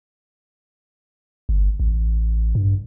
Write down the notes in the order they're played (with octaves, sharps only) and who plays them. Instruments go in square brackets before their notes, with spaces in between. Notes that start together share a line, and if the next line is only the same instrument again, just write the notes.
[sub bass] G1
A1
G2